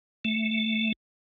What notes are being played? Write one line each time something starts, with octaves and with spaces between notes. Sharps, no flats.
A3